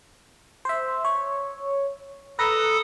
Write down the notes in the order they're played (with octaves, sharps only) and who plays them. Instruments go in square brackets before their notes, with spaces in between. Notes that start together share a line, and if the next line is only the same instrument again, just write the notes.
[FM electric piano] C5 E5
C#5
[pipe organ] A4 D#6 [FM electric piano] B4 A#5